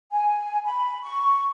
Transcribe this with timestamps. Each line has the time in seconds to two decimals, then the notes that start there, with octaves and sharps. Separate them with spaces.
0.11 G#5
0.65 B5
1.02 C#6